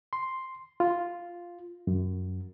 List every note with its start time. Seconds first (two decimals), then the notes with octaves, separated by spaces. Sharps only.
0.13 C6
0.80 F4
1.87 F#2